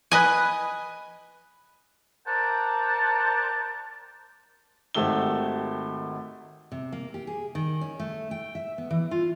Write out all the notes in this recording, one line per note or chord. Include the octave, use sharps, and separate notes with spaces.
B4 D#5 G#5
A#4 C5 D5 F#5 G5 A5
G#1 D#3 A3 G4 E6 G7
C3
A#3
G4
G#4
D#3
C#4
A3
G5
E5
B3
E3
F4